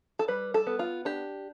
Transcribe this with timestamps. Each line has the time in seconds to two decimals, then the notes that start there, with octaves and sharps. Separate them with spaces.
0.19 A4
0.28 G3 B4
0.54 A4
0.67 B3
0.79 F4
1.05 D4 G4